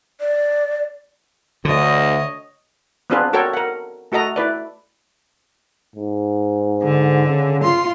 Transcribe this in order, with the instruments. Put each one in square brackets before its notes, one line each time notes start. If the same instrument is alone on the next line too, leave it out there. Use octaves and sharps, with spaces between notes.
[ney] D5
[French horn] D2 [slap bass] D3 [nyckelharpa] C#5 D#5
[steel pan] B3 C4 D4 F4 G#4 B4
F#4 A4 A#4 C#5 G5
A#4 F#5
A3 F#4 A4 D#5 A#5
E4 B4 D5
[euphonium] G#2
[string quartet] D3
[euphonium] C#3
[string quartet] F4 C6